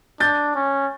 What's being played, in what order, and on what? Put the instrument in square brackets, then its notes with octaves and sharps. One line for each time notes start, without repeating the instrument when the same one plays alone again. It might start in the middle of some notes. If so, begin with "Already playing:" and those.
[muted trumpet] D4 [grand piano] G6 A6
[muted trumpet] C#4